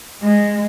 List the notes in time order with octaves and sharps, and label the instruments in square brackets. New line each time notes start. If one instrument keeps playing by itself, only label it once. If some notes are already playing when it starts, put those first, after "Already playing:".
[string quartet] G#3